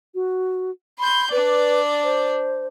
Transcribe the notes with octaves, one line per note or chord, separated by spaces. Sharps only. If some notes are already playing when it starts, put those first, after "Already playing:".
F#4
B5 C6 G6
D4 B4 D5
C5